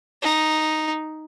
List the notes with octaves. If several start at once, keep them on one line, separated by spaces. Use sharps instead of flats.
D#4